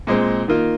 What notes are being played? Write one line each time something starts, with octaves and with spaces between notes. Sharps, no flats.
A#2 G#3 C4
D#3 A#3 F4